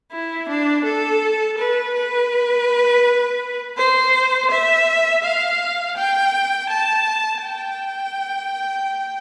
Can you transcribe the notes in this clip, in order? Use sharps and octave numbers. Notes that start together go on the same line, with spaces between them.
E4
D4
A4
B4
B4
C5
E5
F5
G5
A5
G5